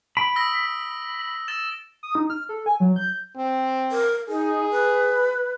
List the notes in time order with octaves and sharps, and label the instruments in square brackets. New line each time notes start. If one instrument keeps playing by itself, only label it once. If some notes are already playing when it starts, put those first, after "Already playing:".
[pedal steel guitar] B5 [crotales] D7
[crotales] D#6 E6 A#6
E6 A6 E7
[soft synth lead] D#6
D#4
F6
A4
G#5
F#3
G6
[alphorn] C4
[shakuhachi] A#4
[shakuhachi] D#4 [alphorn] G#4
[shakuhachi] B4